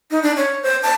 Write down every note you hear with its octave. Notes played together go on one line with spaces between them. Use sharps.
D#4
D4
C#5
C5
A5